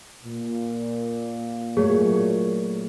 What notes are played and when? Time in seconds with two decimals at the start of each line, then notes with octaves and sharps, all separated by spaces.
0.24 A#2
1.77 F#3 A3 G#4 C#5